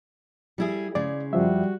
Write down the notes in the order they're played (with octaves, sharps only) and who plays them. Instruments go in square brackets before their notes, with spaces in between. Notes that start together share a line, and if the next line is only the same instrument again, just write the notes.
[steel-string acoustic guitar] G3 E4 G#4
[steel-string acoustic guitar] C#3 G#3 [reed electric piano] D5
[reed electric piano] F#2 F3 E5 [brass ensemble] G3 F#4